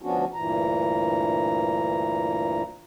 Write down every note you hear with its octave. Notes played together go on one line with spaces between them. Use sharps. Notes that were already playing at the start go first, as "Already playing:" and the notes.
D2 F3 B3 C#4 D4 F#4
D2 G2 A#2 E3 A#5